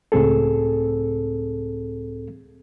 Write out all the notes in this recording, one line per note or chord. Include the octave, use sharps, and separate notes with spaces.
C#2 A2 C4 G#4 A4